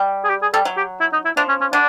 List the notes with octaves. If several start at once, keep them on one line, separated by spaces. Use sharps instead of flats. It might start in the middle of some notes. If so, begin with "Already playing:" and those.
Already playing: G3
G#4
G4
G#4
G3 A4
F#3
G4
E4
D#4
E4
F3 D4
C#4
C#4
D3 D4